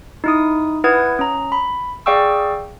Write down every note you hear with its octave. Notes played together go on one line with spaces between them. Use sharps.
D#4 E4 D#6
E4 B4 F#5 D#6 G#6
C#4 A#5
B5
G#4 D5 F5 G5 C#6 E6